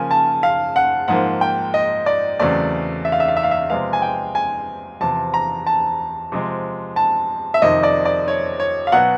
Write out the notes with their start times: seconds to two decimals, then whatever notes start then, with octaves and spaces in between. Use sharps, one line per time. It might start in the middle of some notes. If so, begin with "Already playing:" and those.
Already playing: C#3 F3 A#3 G#5
0.11 A5
0.43 F5
0.76 F#5
1.08 G#2 F3 A#3 F#5
1.41 G5
1.74 D#5
2.06 D5
2.39 E2 C#3 F#3 A3 C4 D5
3.05 E5
3.12 F5
3.20 E5
3.28 F5
3.36 E5
3.43 F5
3.51 E5
3.70 C3 F3 G#3 B3 F5
3.93 G#5
4.02 G5
4.35 G#5
5.01 E2 C3 F3 A5
5.34 A#5
5.67 A5
6.32 C3 F3 G#3
6.96 A5
7.54 E5
7.62 F2 C3 D#3 D#5
7.83 D5
8.05 D5
8.28 C#5
8.60 C#5
8.87 F5
8.92 B2 F#3 B3 F#5